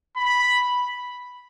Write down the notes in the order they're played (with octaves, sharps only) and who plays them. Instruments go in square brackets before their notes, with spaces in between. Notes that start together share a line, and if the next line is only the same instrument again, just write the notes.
[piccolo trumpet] B5